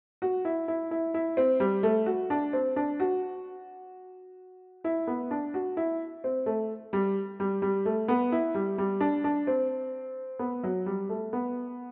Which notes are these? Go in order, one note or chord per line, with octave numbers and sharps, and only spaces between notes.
F#4
E4
E4
E4
E4
C4
G3
A3
F#4
D4
C4
D4
F#4
E4
B3
D4
F#4
E4
C4
A3
G3
G3
G3
A3
B3
E4
G3
G3
D4
D4
C4
B3
F#3
G3
A3
B3